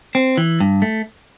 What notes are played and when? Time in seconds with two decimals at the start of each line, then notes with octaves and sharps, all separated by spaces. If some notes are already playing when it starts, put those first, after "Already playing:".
0.15 C4
0.37 E3
0.60 G2
0.82 A3